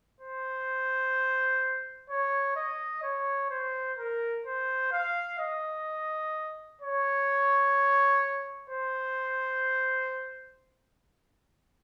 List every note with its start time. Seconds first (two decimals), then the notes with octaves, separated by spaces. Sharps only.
0.21 C5
2.10 C#5
2.56 D#5
3.03 C#5
3.50 C5
3.98 A#4
4.46 C5
4.92 F5
5.39 D#5
6.81 C#5
8.70 C5